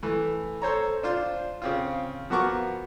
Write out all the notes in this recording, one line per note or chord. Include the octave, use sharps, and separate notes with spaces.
E3 A3
A4 C5 C#5 A#5
D4 F4 C5
C#3 C4 F4
F3 B3 F#4 A#4 C#6 D6